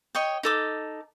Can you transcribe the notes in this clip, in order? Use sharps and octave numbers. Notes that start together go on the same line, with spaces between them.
C#5 D#5 G5
D#4 A4 D6